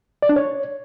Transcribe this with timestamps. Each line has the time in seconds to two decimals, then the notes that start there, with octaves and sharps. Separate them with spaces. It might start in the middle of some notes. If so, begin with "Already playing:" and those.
0.22 D5
0.29 D4
0.36 C#5